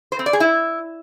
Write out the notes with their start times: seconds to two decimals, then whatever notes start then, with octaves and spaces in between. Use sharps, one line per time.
0.12 C5
0.19 C4
0.26 D5
0.33 G#4
0.40 E4